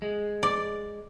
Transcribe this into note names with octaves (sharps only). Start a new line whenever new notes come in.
G#3
D5